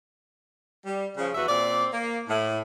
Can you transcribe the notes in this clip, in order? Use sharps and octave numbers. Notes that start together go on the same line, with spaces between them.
G3
C#3 F3
E2 B3 F#4 E5
A#2 C4 D5
A#3
A2